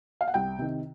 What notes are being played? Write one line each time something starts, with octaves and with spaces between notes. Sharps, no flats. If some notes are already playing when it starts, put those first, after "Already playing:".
F5
F#5
C2 G5
C3 D#3